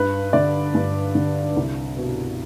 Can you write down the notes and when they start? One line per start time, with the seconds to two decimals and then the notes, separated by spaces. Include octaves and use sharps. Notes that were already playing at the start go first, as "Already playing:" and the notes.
Already playing: G2 B4
0.33 D3 D5
0.75 G2
1.15 D3
1.57 C2
1.97 B2